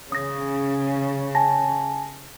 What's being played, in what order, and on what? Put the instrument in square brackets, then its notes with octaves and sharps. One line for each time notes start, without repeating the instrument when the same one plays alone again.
[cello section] C#3 [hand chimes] D#6 A#6
[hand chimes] G#5 A5 A#6